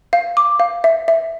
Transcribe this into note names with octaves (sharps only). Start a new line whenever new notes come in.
F5
D6
F5
E5
E5